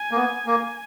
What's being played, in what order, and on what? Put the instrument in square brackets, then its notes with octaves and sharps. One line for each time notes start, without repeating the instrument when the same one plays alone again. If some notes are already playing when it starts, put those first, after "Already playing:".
Already playing: [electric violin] G#5
[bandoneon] A#3
B3
A#3